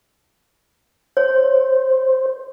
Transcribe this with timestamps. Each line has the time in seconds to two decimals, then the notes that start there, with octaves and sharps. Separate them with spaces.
1.17 C5 C#5